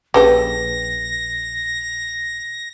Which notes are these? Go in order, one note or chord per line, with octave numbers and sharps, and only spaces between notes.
A#1 C#3 G4 A4 B4 G5 A5 A#6